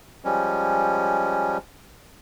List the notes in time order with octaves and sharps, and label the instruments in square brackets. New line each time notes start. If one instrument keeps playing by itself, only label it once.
[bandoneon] F3 G3 G#3 C#4